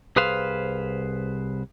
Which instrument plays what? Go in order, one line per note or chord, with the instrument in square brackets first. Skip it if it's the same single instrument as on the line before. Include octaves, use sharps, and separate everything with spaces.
[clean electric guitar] C2 G#4 B4 C5 F5